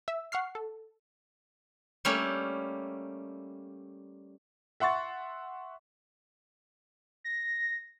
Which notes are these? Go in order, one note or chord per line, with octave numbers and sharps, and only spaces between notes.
E5 E6
F#5 C#6 F6 C7
A4
G3 A3 A#3 C#4 G4
E5 F#5 C6 C#6 A6
A#6